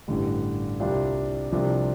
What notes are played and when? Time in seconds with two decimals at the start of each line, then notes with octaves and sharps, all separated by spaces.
0.08 A1 G2 D3 G3
0.80 C2 C3 G3 D4 F4
1.52 C2 C3 F3 D4 F4